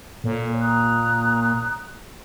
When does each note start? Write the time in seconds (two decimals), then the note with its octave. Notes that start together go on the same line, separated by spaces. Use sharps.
0.24 A#2 A4 C#5
0.61 A#5 D#6 F#6